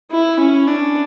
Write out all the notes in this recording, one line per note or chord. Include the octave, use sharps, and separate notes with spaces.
E4
C#4
D4